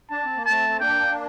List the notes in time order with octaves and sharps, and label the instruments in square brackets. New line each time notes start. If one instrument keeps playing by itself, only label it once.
[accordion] D4 [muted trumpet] A5
[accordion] C4
A#3
[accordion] A3 C4 [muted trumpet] A5
[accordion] C4
[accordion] A#3 D4 [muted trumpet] G5